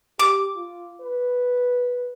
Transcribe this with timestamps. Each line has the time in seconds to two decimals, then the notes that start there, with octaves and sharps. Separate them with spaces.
0.19 G4 D6
0.56 F4
1.01 B4